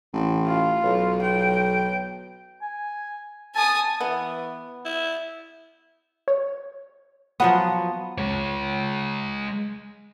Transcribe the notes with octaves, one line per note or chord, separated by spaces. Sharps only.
A1
F4
B1
G5
G#5
G#5 A5 D#6
E3 B3
E4
C#5
F3 F#3 B3 F#5 D#6
G#3 C#5